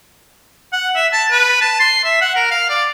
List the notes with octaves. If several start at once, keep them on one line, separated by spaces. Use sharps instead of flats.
F#5
E5
A5
B4
A5
C6
E5
F#5
A#4
F5
D5